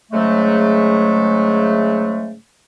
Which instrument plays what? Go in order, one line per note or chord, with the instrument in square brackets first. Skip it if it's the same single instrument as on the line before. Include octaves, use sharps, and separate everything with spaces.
[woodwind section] G#2 C#3 F#3 G#3 A3